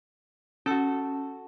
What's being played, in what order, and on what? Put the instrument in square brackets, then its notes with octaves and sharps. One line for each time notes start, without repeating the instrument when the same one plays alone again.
[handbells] C#4 E6 [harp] F#4 A4